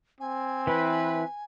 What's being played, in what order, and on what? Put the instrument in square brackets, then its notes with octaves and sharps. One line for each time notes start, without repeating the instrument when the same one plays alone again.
[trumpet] C4 [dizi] G#5
[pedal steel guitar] E3 E4 [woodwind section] B4